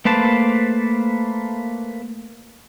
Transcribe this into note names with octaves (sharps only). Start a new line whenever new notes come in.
A3 A#3 B4 C5 A5